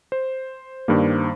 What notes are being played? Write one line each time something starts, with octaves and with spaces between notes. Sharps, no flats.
C5
G2 D#3 G3 A#3